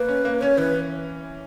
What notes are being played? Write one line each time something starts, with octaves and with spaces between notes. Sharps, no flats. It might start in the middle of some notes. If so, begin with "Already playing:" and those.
Already playing: A#3 B4
C#4
A#3
C#4 C#5
E3 B4